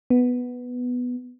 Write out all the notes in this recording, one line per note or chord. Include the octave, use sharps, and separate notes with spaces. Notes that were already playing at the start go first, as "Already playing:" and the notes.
B3